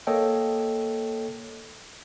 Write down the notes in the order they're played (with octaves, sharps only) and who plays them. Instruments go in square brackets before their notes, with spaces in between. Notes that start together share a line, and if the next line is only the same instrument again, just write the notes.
[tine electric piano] A#3 A4 C#5 D#5 G5